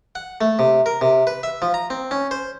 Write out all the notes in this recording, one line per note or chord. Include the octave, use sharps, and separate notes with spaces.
F#5
A3
C3
A#4
C3
B4
E5
F3
A#5
C4
C#4
C5